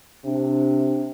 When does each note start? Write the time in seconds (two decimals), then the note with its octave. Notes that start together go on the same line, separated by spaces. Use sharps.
0.25 C3 D4